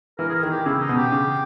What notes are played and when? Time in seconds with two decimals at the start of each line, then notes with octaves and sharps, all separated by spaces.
0.19 E3 A#4
0.29 G#4
0.35 A#4
0.43 D#3 G#4
0.50 G4
0.66 C#3 E4
0.81 D#4
0.89 B2
0.97 G4
1.12 C#3